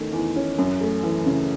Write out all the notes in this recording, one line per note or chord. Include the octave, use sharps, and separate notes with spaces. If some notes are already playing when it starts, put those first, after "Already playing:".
Already playing: E2 D#3 A3 C#4
E2
C#4
F#2
A3
E3
C#3